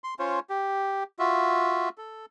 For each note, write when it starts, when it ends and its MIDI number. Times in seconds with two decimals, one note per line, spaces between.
0.04 0.14 84
0.19 0.40 61
0.19 0.40 65
0.19 0.40 72
0.19 0.40 73
0.50 1.04 67
1.19 1.89 65
1.19 1.89 66
1.19 1.89 76
1.98 2.26 69